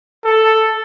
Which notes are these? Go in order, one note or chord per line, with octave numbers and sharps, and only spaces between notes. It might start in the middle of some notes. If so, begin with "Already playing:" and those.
A4